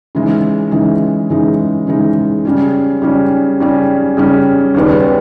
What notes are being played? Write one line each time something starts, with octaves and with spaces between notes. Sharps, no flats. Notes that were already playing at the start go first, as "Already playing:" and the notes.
C#3 E3 G#3 D#4
C#3 E3 G#3 D#4
C#3 E3 G#3 D#4
C#3 E3 G#3 D#4
C#3 G3 C#4
C#3 G3 C#4
C#3 G3 C#4
C#3 G3 C#4
D#2 C#3 G3 B3